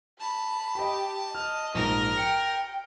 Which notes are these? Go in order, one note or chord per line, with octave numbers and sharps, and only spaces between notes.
A5 B5
G4 D#5 B5
D#5 F6
A#1 G#2 A#4
G5 C#7